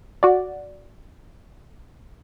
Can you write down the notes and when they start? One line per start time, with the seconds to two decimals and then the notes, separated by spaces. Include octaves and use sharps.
0.23 F#4 D5